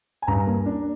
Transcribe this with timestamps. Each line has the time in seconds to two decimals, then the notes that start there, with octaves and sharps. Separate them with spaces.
0.22 G#5
0.27 G2 A#5
0.46 A#3
0.66 D4